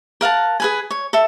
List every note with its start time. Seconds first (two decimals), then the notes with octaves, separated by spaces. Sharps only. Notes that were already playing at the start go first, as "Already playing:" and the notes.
0.21 A#4 F5 F#5 A5
0.60 G#4 B4 G#5
0.91 C#5
1.13 A4 E5